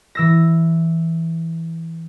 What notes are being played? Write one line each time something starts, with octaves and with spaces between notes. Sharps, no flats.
E3 E6 A#6